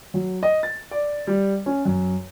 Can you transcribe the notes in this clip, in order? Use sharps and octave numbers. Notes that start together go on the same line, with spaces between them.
F#3
D#5
A6
D5
G3
C#4
F#2